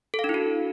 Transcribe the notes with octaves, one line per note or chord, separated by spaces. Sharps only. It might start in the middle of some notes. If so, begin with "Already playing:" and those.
A4
F5
D4
E4
F#4